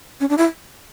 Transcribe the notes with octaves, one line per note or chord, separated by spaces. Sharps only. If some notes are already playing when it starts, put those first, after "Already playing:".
C#4
D4
E4